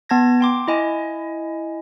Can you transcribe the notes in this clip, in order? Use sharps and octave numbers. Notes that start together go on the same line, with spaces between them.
B3 A5 G#6 A#6
G5 C6 D6
E4 D#5 G#5